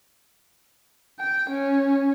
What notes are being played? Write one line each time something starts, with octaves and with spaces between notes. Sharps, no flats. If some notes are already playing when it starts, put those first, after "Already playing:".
G5
C#4